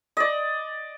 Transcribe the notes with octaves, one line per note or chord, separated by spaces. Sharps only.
D5 D#5